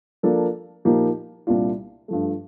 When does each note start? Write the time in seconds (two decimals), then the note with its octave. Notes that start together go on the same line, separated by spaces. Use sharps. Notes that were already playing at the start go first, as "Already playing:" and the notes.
0.23 F3 A#3 D4 A4
0.85 A#2 F3 A#3 D#4 G4
1.47 C2 A#2 G3 D4 F4
2.08 G2 F3 A3